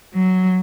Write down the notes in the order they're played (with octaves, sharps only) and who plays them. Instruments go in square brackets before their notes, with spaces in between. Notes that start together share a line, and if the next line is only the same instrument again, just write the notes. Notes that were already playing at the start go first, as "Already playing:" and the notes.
[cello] F#3